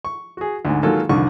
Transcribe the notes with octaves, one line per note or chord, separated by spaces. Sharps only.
C#6
F#4 G#4
D2 G#2
D#3 F#3 G#3 A#3 F4 A4
C2 F2 D3 D#3 C#6